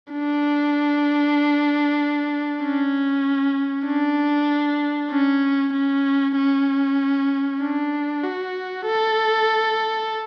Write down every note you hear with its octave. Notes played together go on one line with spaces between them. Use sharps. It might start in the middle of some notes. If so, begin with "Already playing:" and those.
D4
C#4
D4
C#4
C#4
C#4
D4
F#4
A4